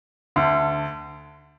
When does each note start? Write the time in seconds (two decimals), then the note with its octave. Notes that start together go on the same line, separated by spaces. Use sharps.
0.36 D2 D3